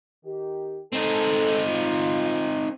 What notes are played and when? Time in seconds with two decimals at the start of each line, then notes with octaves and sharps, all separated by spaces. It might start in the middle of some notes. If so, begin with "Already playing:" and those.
0.25 D#3 G4
0.93 C4 D#4 A4
1.68 F4